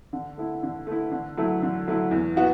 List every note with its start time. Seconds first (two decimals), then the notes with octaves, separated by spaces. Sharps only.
0.13 D3
0.37 A3 E4
0.63 D3
0.87 A3 E4
1.12 D3
1.37 F#3 A3 E4
1.62 D3
1.87 F#3 A3 E4
2.11 E2
2.36 E3 B3 F#4